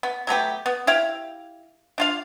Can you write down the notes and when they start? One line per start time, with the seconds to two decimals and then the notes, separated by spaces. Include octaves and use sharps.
0.03 B3
0.27 F#3 A3 B3 G4
0.66 B3
0.87 E4 G4 F5
1.98 D4 F4 F5